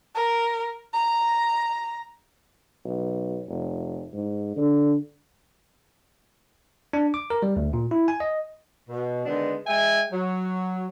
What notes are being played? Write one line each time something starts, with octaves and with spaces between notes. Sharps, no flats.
A#4
A#5
B1
F1
G#2
D3
D4
D6
A#4
G3
D2
A#2
E4
G#5
D#5
B2
D3 D#3 G#3 B3 D4 D#4
G#3 E5 G5 G#5
F#3